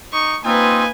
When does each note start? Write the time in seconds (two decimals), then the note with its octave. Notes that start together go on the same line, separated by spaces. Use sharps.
0.13 D#4 C#6
0.45 A#3 C4 D#4 F4 B4 G#5